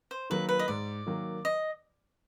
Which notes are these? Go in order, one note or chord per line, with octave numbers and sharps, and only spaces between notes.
C5
D#3 F#3 A#3 B4
B4
D#5
G#2 D5
D#3 F#3 A#3
D#5